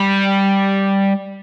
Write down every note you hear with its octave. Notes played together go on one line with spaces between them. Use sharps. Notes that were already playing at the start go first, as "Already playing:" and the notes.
Already playing: G3